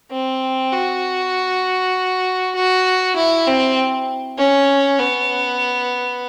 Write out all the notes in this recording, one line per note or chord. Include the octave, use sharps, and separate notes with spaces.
C4
F#4
F#4
E4
C4
C#4
B3